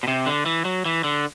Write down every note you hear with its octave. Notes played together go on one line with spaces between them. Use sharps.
B2
C3
D3
E3
F#3
E3
D3